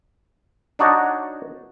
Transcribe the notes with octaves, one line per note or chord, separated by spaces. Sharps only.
D4 D#4 F#4 C#5 D5